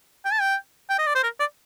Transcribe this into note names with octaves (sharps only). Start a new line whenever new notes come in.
G5
A5
G5
G5
D#5
D5
C5
A#4
D5